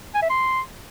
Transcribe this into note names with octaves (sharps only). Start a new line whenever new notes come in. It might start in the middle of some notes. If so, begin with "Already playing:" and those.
G#5
E5
C6